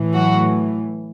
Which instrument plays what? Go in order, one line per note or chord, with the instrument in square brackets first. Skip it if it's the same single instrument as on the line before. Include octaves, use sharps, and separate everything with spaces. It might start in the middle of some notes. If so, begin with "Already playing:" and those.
Already playing: [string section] A2 E3
F#3 F#4